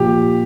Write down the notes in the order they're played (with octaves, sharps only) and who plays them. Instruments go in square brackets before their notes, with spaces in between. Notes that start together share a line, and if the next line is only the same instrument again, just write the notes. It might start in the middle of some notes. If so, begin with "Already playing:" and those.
Already playing: [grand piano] A#2 F3 G4